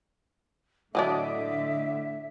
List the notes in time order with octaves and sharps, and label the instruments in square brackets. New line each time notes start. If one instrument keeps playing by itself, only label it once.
[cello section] A2 D3 [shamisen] E3 F#3 D4 [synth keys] D#5 D6 [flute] E5